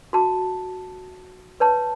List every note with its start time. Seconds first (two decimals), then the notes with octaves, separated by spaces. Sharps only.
0.13 F#4 A5
1.60 B4 C#5 A5